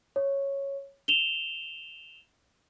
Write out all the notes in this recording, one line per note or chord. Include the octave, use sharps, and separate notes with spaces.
C#5
E7 F7 G7